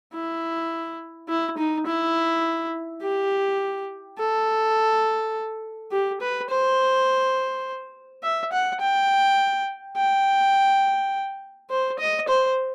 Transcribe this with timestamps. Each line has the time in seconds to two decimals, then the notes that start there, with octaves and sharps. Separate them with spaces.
0.14 E4
1.29 E4
1.58 D#4
1.86 E4
3.02 G4
4.19 A4
5.91 G4
6.21 B4
6.50 C5
8.23 E5
8.53 F#5
8.81 G5
9.97 G5
11.71 C5
11.99 D#5
12.29 C5